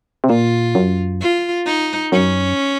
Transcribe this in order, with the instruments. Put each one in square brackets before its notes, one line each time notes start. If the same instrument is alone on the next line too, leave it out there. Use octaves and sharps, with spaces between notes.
[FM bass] C3
[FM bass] A#2 [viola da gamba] F4
[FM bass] F#2
[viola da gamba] F4
D#4
[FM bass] F#2 [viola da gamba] C#4